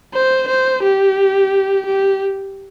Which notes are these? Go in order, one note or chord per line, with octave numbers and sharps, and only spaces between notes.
C5
C5
G4
G4